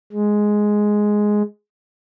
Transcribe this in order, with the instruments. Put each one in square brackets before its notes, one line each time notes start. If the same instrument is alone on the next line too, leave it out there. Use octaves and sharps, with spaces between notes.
[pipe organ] G#3